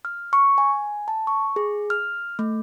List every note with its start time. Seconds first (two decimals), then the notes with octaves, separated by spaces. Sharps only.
0.05 F6
0.33 C#6
0.58 G#5
1.08 A5
1.27 C#6
1.56 G#4
1.90 F6
2.39 A3